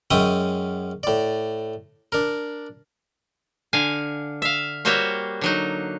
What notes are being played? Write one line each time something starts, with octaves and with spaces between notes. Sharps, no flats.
F#2 G#3 C#4 E5 G5 D#6
A2 D5
D4 A#4
D3 F5 G#5
E5 F5
G3 A#3 F#4 C5 C#5 E5
D3 F#3 D#4